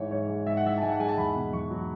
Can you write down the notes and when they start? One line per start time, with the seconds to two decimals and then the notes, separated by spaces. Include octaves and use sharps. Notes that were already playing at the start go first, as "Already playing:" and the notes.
Already playing: G#2 E3 C#5
0.11 G#2 C#5
0.28 G#3
0.46 G#2 E5
0.57 F#5
0.64 E3 E5
0.78 A5
0.82 G#2 G#5
0.91 F#5
1.00 G#3 G#5
1.09 A5
1.17 E2 B5
1.35 B2
1.53 E2 C#6
1.70 F#3